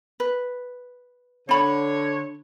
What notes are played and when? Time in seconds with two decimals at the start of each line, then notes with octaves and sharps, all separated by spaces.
0.20 B4
1.49 D3 D4 C#5 B5